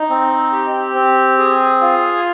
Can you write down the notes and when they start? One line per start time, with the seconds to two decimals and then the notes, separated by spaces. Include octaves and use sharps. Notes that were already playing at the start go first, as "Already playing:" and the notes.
Already playing: D#4
0.10 C4
0.52 G4
0.94 C4
1.38 G#4
1.81 F4